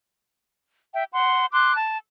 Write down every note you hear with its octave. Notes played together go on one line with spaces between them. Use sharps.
E5 G5
F#5 C6
C6 D6 F#6
A5